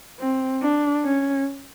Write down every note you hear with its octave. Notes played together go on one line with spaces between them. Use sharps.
C4
D4
C#4